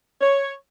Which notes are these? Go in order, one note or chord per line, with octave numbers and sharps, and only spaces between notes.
C#5